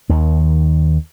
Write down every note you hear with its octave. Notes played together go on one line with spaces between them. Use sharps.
D#2 D#3